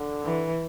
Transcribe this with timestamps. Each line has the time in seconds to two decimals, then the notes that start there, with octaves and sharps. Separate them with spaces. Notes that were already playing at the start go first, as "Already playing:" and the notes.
Already playing: D3
0.24 E3